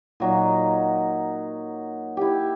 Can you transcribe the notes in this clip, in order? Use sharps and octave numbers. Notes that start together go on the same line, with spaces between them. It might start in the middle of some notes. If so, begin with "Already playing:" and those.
A#2 F#3 D#4
E4 G4